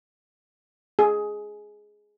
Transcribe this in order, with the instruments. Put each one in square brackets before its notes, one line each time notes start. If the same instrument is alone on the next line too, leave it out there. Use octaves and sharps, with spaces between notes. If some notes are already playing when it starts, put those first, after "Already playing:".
[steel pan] G#4